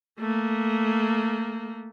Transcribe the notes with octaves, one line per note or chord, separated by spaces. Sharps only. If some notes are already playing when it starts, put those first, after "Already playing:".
A3 A#3